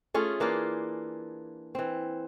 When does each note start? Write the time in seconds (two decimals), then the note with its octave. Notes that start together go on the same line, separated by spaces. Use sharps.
0.14 A3 C#4 F4 G#4
0.40 E3 A#3 D4 F4
1.75 E3 C4